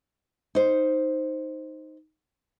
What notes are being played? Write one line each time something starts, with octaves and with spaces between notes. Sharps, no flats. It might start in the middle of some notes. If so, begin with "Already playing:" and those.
D#4 C5